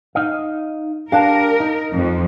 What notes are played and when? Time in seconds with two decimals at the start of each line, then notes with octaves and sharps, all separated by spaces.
0.15 D#4 D#5 F5
1.12 D4 G4 A#4 F5 A5
1.60 D#4
1.93 F2